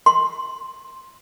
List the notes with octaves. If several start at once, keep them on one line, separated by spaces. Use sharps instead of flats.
C6